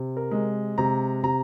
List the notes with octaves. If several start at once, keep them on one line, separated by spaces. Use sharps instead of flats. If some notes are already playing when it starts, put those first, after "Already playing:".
Already playing: C3
A#4
G#3
C3 A#5
C3 A#5